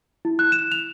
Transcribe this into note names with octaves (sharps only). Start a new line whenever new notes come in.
E4
F#6
E7
F7